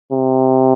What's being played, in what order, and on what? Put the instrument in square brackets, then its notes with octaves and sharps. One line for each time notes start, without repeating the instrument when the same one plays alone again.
[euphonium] C3